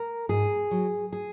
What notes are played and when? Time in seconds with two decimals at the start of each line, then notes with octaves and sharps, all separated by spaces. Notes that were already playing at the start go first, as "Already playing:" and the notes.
Already playing: A#4
0.29 G#2 G#4
0.71 F#3
1.12 G#4